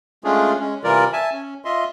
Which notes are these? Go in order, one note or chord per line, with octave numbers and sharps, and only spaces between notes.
G#3 A3 C#4 D4 F4 G#4
G#3 C#4
C3 E3 G3 F4 A#4 D5
E5 G#5 A5
C#4
F4 D#5 E5 C6